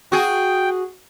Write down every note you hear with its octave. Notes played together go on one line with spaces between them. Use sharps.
F#4 G#4 G5